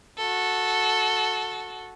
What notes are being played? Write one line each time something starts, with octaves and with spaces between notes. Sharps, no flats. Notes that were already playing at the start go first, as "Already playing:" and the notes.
F#4 A4